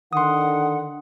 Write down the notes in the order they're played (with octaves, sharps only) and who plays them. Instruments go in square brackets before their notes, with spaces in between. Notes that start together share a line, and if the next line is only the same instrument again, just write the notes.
[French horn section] D3 D#3 [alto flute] F#5 [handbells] C6 D#6